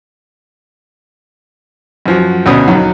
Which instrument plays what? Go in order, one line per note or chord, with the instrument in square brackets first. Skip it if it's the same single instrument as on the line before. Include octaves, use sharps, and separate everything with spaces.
[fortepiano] F#2 F3 F#4
D2 B2 C#4 D#6
D#2 D#3 F#3